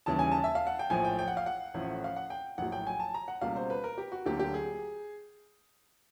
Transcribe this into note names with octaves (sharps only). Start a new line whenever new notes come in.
D#2 C#3 E3 G3 A5
G#5
A5
E5
F5
F#5
G5
A#1 A2 F3 G#5
G5
G5
F#5
F5
F#5
A1 A2 F3
F5
F#5
G5
A#1 A2 F#3 F#5
G5
G#5
A5
A#5
F#5
C#2 B2 G3 A#3 F5
C5
B4
A#4
G4
F#4
D2 D3 F#3 A#3 G4
G4
G#4